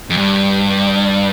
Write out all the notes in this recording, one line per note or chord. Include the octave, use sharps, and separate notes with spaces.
F2
G2